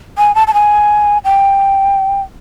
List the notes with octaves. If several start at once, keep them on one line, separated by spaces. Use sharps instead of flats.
G#5
A5
A5
G#5
G5